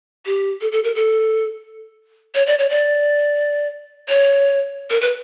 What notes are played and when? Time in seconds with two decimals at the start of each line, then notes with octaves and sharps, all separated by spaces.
0.26 G4
0.61 A4
0.72 A4
0.84 A#4
0.95 A4
2.35 C#5
2.47 D5
2.58 C#5
2.70 D5
4.09 C#5
4.90 A#4
5.01 B4